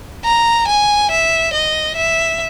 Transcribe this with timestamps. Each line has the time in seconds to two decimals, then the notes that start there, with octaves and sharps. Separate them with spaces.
0.25 A#5
0.68 G#5
1.11 E5
1.53 D#5
1.97 E5